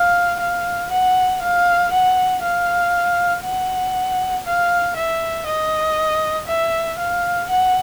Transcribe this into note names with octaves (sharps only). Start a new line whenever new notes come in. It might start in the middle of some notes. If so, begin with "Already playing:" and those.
Already playing: F5
F5
F#5
F5
F#5
F5
F#5
F5
E5
D#5
E5
F5
F#5